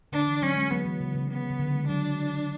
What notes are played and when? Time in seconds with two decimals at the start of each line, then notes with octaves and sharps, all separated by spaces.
0.12 D3 D4
0.27 E3
0.42 F#3 C#4
0.56 G#3
0.71 F#3 B3
0.86 E3
1.00 C#3
1.15 C#3
1.30 B3
1.50 C#3
1.59 D3
1.74 G#3
1.88 F#3 D4